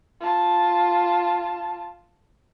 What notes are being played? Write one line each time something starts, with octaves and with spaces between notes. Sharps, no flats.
F4 A5